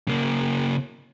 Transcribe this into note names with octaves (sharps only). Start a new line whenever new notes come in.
C#3 A#3